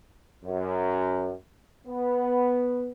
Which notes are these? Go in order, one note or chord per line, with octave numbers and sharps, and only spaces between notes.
F#2
B3